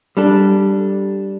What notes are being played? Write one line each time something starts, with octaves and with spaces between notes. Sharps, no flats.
G3 D4 A4